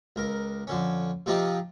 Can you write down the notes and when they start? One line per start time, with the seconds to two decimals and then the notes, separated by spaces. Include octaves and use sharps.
0.16 C#2 A#4
0.67 F2 D3 C#4
1.26 C3 F3 C4 D#4 F4 G4